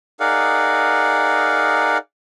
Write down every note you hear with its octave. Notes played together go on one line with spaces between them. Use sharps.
D#4 G#4 A#4 D5 F5 F#5